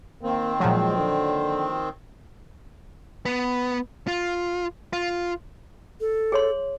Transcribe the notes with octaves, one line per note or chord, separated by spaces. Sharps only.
D#3 A#3 C4
A#2 F3 F#3 G#3
D3
B3
F4
F4
A4
G#4 C#5 C6